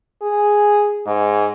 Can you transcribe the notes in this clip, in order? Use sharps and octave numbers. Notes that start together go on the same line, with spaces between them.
G#4
G#2